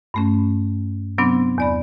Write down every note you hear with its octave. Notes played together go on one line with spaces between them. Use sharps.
G2 A3 C#4
C3 F#3 B3 C4 D4
E2 D5 B5